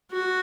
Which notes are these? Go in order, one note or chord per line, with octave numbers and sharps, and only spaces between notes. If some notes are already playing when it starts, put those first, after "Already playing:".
F#4